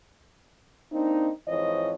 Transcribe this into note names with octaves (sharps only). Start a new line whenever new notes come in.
A#3 C4 D4 D#4
F2 G#2 E3 C5 C#5 D#5